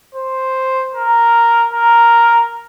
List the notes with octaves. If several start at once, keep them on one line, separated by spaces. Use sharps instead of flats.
C5
A#4
A#4